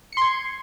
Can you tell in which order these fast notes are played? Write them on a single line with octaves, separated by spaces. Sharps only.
C#7 C6 G#6